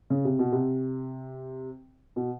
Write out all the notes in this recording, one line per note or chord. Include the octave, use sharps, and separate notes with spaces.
C#3
C3
B2
C3
B2